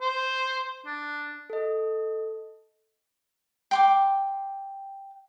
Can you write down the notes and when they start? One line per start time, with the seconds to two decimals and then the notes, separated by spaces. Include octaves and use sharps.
0.01 C5
0.86 D4
1.50 A4 D#5
3.71 G5 C6 D6